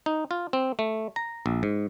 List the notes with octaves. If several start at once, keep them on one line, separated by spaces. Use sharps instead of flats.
D#4
F4
C4
A3
A#5
A#1
G#2